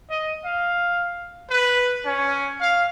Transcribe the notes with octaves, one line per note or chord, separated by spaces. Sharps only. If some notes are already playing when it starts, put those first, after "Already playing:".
D#5
F5
B4
C#4
F5